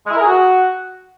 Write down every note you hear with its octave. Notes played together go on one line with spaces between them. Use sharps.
G#3
E4
A#4
G#4
F#4